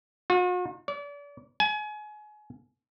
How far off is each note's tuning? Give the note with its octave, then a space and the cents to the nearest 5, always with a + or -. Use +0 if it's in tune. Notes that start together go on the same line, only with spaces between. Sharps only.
F#4 -45
D5 -40
G#5 +30